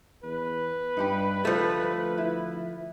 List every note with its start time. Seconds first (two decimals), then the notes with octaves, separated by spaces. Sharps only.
0.24 E2 B4
0.97 G2 D#4 G4 B5
1.45 D2 F3 A3
2.18 E4